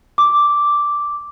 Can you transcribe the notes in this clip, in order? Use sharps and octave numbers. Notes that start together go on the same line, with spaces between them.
D6